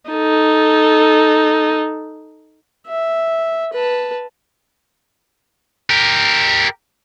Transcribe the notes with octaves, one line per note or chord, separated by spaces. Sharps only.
D#4 A4
E5
B4 A5
G4 A#4